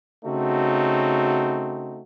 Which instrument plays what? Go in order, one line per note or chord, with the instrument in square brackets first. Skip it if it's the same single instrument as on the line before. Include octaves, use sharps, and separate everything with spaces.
[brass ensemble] C#3 A3 C4 D#4 F#4